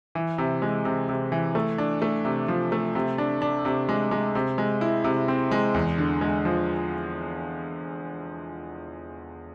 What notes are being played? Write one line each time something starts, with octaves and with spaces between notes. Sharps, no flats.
E3
C3
G#3
C3
C3
E3
A3
D4
A3
C3
F3
A3
C3
D4
D4
C3
G#3
G#3
C3
G#3
E4
C3
C4
G#3
E2
D3
G#3
F3